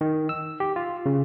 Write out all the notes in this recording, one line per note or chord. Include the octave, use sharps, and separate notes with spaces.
D#3
E6
G4
F4
C#3